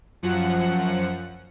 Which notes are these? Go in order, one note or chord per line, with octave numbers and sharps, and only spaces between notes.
F#2 F3 F#5